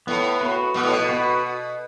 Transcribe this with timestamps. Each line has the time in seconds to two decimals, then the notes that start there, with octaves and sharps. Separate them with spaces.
0.07 A2 B3
0.41 F#4 B4
0.74 B2 B3
0.83 A2
0.90 B2
1.09 F#4 B4